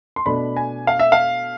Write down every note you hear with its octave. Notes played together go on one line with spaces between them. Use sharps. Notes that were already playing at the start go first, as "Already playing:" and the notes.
C6
B2 A3 D4 B5
G#5
F5
E5
F5